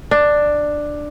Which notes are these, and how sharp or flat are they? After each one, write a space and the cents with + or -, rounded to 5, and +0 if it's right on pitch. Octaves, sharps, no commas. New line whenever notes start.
D4 +10